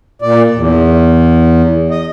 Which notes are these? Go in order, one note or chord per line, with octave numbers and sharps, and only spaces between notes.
A#2 D5
E2
D#5